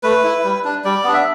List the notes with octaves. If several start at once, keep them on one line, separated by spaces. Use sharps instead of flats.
A3 B4
E4
G3
D4
G3 D5
B3 D4
E5